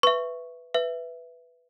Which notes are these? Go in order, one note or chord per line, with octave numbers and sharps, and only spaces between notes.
B4 E5 C#6
B4 E5